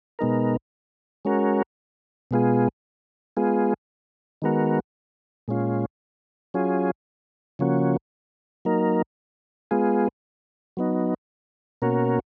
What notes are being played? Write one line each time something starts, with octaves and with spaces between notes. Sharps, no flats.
B2 G#3 B3 D#4 A#4
G#3 C#4 F#4 A#4
B2 G#3 B3 F4 G#4
G#3 B3 F4 G#4
D#3 G#3 B3 F#4 A#4
A#2 G#3 C#4 F4
F#3 C#4 F4 G#4
C#3 F3 A#3 C#4 F#4
F#3 A#3 D#4 A#4
G#3 B3 F4 G#4
F#3 B3 D#4
B2 A#3 C#4 F#4 A#4